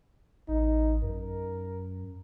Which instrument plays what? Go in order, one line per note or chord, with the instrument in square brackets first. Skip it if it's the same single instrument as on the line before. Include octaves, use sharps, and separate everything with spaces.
[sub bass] A1 [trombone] D#4
[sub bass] F#2 [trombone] A#4